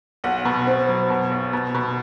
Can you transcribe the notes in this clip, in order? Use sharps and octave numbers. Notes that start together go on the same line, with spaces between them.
B1 F#5
B2
C4
F#3
B2
B1
B2
B2